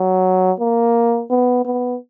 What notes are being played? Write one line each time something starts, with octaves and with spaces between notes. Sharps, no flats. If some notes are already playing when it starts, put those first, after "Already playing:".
Already playing: F#3
A#3
B3
B3